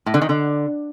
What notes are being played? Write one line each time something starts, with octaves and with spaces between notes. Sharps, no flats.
A2
D3
D#3
D3